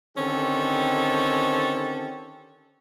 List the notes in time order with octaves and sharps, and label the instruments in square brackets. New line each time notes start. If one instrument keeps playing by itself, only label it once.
[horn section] D3 D#3 C4 C#4 G4 A4